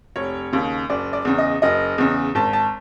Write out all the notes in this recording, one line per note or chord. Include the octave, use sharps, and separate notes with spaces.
F1 C#5
D#2 C#3
F#1 D5
D5
E2 C#3
D#5
F#1 D#5
E2 C#3
G#1 A5
A5